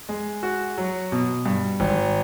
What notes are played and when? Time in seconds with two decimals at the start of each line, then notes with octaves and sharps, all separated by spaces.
0.09 G#3
0.43 F#4
0.78 F#3
1.12 B2
1.45 G2
1.80 G#1